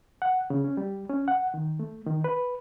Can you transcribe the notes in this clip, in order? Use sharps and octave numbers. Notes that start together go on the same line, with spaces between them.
F#5
C#3
C#4
G3
C#4
F#5
D#3
A3
D#3
B4